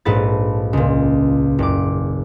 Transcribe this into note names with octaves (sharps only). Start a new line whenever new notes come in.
A#1 G#2 A4 B4 A6
C#2 A#2
F#1 D6